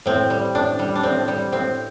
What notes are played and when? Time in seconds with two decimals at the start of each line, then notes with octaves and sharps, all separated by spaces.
0.06 A2 C4
0.30 G3
0.55 A2 D4
0.79 G3
0.95 D4
1.03 A2 C4
1.28 G3
1.52 A2 C4